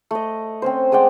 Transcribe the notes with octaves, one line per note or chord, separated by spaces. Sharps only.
A3 D#5
C4 C#4 C5
G#3 D5 F#5 G5